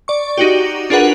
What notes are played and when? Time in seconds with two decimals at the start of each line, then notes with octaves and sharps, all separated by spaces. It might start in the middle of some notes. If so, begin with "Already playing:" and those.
0.08 D5 C#6
0.38 D#4 F#4 G4
0.90 D4 F4 G#4 A#4 B4 F#5